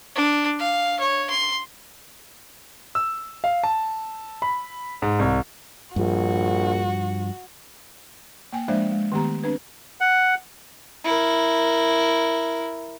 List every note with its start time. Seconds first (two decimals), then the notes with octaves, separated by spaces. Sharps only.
0.15 D4
0.59 F5
0.99 C#5
1.30 C6
2.95 E6
3.44 F5
3.64 A5
4.42 B5
5.02 G#2
5.19 C2
5.96 A#1 G2 F3 F#4
8.53 A#3 G5 G#5
8.68 F3 G#3 A#3 D4 C5 E5
8.92 G#3
9.12 D#3 A3 B3 G4 A#5
9.43 C4 D4 B4
10.01 F#5
11.05 E4 A#4